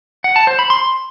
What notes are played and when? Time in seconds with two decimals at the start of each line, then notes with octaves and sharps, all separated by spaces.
0.24 F#5
0.36 A5
0.47 C5
0.59 B5
0.70 C6